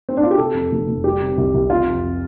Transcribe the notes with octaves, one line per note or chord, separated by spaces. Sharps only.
C4
D4
F4
G4
C3 A4
F2
F1
F1
G3 G4
C3
C2
C2
C3 F4
F2